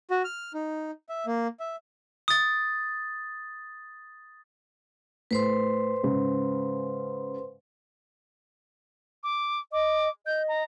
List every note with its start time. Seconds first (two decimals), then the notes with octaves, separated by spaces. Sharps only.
0.11 F#4
0.25 F6
0.54 D#4
1.09 E5
1.26 A#3
1.60 E5
2.28 D#6 A6
5.31 A2 B4 C5 C6
6.03 G#2 C#3
9.23 D6
9.73 D#5 D6
10.26 D#5 G6
10.48 A#5